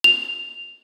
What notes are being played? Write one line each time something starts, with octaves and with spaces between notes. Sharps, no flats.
F7